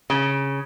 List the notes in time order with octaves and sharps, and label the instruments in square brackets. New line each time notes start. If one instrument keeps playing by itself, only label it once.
[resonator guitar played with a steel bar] C#3